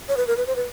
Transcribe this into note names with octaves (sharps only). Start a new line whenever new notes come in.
C#5
B4
A#4
B4
C5
B4